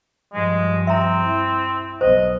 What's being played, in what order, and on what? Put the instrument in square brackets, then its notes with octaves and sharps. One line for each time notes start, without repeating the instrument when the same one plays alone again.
[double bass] G2 F3 [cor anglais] G#3
[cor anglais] C4 [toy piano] E5 A#5
[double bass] E4
[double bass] B1 B2 [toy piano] C5 [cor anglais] D#5